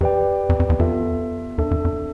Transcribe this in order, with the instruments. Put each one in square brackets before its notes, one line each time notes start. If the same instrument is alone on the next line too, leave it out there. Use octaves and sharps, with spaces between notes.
[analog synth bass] F2 [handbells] G4 B4 D5 G5
[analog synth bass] F2
F2
E2
[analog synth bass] F2 [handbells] B3 F4 A4 E5
[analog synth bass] E2 [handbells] D4 A4 E5
[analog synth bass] F2
F2